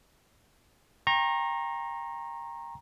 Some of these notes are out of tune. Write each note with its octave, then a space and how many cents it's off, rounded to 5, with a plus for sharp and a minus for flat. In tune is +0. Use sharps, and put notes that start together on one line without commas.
G5 +20 A#5 +0 C#6 -40